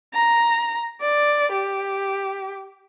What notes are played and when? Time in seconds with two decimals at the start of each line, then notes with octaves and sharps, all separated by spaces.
0.14 A#5
1.01 D5
1.52 G4